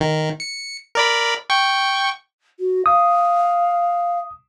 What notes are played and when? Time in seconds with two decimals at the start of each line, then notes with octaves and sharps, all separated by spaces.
0.01 D#3
0.40 C#7
0.95 A#4 D5 B5
1.50 G5 C#6
2.59 F#4
2.86 F5 D#6